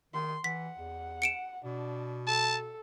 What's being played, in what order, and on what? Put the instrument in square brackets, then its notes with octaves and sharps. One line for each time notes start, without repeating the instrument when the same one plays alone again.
[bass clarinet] D#3 [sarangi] C6
[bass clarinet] E3 [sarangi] F#5 [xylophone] B6
[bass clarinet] E2
[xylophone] C#7 D7 E7
[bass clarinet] B2 [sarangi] D4
[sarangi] A4 [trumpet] A5